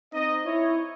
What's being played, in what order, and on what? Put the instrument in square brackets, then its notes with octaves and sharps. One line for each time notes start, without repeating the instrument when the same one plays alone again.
[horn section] C4 D#4 D#5
E4 C#5